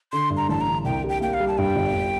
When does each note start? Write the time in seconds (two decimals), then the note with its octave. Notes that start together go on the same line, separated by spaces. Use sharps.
0.12 D3 C6
0.30 G2
0.37 A#5
0.49 A1 A5
0.61 A#5
0.67 D3
0.85 C2 G5
1.04 G3
1.09 G5
1.21 A#3 G5
1.34 F5
1.40 G3
1.48 A5
1.58 G2 G5
1.76 G1
1.94 G2